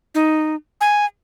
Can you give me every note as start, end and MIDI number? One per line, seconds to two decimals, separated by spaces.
0.15 0.55 63
0.81 1.06 80